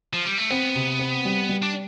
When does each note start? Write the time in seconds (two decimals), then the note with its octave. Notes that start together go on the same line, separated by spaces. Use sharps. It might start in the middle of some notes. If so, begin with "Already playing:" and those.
0.13 F3
0.26 G3
0.38 A3
0.50 B3 C4
0.75 C3
0.99 C4
1.25 G3
1.49 G3
1.62 D4